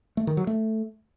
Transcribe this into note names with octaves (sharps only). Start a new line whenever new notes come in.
A3
D#3
F#3
A3